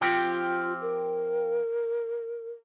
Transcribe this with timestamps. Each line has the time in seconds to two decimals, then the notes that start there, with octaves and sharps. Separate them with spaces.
0.01 F3 C4 F4 G4
0.81 A#4